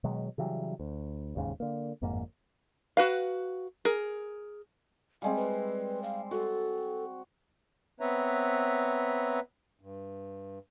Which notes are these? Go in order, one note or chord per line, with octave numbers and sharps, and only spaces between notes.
B2 D#3 F#3 G#3
C#3 E3 F#3 G3
D2
E1 D#2 G#2 C#3
D3 A#3
G1 F2 G#2 A#3
F#4 B4 F5
G#4 A#4
G3 G#3 C4 F5
B4
F5
F#4 A4
B3 C4 B4 C#5 E5 A#5
G2